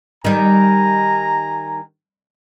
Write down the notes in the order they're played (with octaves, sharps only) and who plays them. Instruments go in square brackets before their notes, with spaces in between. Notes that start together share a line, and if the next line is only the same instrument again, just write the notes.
[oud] D#3 G3 [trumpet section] G#5 A#5